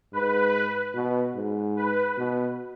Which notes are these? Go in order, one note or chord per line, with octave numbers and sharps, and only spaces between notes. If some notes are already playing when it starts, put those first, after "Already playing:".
G#2 B4
B2
G#2
B4
B2